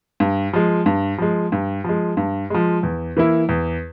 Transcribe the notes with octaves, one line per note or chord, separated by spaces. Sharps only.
G2
F3 G#3
G2
F3 G#3
G2
F3 G#3
G2
F3 G#3
E2
E3 A#3 E4
E2